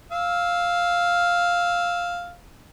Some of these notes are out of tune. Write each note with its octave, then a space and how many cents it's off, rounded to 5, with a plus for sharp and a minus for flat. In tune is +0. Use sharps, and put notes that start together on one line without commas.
F5 +5 E6 -10